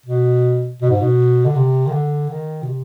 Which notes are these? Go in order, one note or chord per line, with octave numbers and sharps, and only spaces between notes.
B2
B2
G#2
B2
D3
C3
D#3
D3
D#3
B2
C3